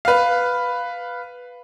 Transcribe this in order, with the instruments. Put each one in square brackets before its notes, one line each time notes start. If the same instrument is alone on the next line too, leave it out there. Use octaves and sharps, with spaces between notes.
[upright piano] B4 F5